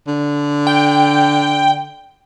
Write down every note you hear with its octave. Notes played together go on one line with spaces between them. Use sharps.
D3
G5